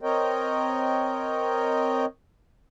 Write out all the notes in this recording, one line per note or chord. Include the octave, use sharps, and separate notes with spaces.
C4 A#4 C#5 D#5 G5